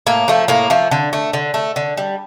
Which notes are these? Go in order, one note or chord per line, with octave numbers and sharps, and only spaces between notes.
A2 A#3
F3 A3
A2 A#3
F3 A3
D3
A3
D3
A3
D3
G3